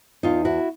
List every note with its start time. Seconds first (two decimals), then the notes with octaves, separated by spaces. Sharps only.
0.23 E2 D#4 F4
0.45 E4 F#4